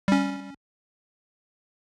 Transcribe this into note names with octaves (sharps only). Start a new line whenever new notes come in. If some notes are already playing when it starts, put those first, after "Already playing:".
G3 C#4